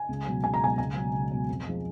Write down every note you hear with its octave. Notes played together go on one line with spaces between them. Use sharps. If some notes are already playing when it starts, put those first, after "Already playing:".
Already playing: G#5
C#2
B2 F#3
C#2 G#5
A#5
B2 F#3 G#5
C#2 G#5
B2 F#3
C#2
B2 F#3
F2
F3 G#3